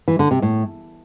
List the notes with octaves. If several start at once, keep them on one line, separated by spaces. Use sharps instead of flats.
E3
D3
C3
A2